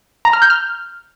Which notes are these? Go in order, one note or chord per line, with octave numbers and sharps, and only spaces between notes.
A#5
F6
G6
F6